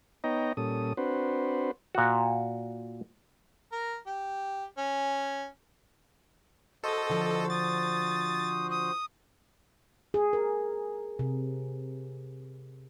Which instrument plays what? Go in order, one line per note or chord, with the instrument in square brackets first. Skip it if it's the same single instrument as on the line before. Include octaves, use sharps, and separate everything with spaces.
[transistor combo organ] B3 D#4 C#5 D#5 G5 A#5
A#2 G3 C#4 A4 D#6
C4 D4 F#4 B4 C5
[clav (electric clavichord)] A#2 F#4
[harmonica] A#4
G4
C#4
[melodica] F#4 C5 [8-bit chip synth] A4 [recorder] D#5
[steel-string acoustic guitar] D3 F3
[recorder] D#6 [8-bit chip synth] A6
[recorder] D#6
[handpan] G#4
A#4
C3